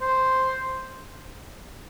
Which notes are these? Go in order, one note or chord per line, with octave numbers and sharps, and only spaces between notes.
C5